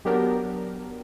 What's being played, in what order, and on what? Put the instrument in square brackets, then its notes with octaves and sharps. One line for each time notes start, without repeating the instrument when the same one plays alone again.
[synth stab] F#3 B3 D4 G4 A#4